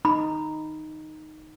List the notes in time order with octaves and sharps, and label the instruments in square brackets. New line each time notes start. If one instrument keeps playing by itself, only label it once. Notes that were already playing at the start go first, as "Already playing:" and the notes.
[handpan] D#4 [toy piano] B5